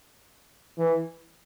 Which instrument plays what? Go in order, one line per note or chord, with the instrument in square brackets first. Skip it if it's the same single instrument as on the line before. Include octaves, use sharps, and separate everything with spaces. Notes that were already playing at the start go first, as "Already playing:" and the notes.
[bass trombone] E3